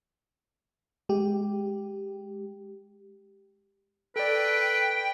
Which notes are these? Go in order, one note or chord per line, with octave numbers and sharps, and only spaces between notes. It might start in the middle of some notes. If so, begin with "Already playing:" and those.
G#3 G4
A4 B4 D5 G5